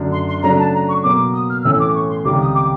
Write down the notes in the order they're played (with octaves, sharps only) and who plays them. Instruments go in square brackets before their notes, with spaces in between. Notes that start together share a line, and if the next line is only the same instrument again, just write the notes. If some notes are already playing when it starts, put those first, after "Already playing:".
Already playing: [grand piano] F#2 D3 F#3 A3 D4
[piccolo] C6
C6
[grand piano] C#3 F#3 A3 D4 [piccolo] A#5
[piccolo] A5
A#5
C#6
[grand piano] B2 F#3 A#3 [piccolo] D6
[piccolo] D#6
F6
F6
[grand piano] A2 E3 A3 C#4 [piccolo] E6
[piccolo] D6
C#6
C6
[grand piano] C#2 C3 D#3 G3 [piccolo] D6
[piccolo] D#6
D6